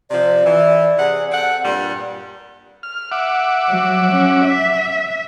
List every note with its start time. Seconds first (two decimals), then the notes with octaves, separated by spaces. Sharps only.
0.10 C3 F3 D5
0.43 E3
0.97 C3 G#4 F#5
1.31 C4 A4 F#5
1.64 G2 A#2 G3
2.83 F6
3.12 E5 F#5 D6
3.69 F#3
4.12 C#4
4.45 E5